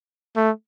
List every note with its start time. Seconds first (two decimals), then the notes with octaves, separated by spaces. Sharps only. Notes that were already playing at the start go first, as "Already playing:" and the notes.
0.36 A3